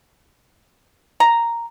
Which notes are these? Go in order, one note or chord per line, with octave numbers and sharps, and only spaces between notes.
A#5